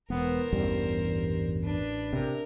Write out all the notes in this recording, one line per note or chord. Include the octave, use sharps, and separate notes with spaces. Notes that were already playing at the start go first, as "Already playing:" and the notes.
E1 B3 A#4 C5
A1 E2 G2 G3
D4 B4
C3 A#4